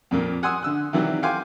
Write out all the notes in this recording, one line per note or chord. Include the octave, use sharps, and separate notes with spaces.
F2 A#2 A#3
F#5 G#5 C6 D#6 E6
D3 E6 F#6
C3 D#3 E3 F#3 G3
F#4 F5 G5 G#5 C6 D6